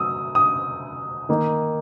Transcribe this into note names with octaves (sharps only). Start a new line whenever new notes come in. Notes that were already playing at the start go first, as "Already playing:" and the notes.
Already playing: F#3 D#6 E6
D#6
D#3 A#3 D#4